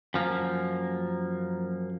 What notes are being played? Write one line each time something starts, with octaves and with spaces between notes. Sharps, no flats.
F#2 F3 A#3